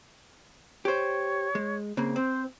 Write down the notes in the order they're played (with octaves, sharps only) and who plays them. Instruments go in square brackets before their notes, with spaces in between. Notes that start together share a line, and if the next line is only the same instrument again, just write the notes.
[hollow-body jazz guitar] G4 C5 [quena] C#5
[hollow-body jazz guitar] G#3
C#3 A#3 C4
[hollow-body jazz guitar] C4 [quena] C5